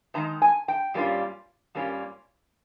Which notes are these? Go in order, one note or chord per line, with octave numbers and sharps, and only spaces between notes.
G#2 D#3 G#3 A#5
G#5
G5
G2 G3 A#3 C#4 F4
G2 G3 A#3 C#4 F4